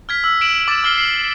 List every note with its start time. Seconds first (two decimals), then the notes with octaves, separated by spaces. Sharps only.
0.09 F6 G#6 B6
0.24 E6
0.41 D7 E7 F#7
0.68 D6 A6
0.84 E6 F6 C7 G7
0.98 C7 F#7